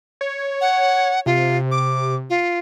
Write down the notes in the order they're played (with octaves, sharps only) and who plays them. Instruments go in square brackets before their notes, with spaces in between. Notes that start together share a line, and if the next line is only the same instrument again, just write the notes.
[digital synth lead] C#5
[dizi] F#5
[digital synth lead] C3 [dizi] F4
[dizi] D6
F4